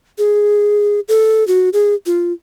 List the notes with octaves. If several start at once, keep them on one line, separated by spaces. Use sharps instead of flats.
G#4
A4
F#4
G#4
F4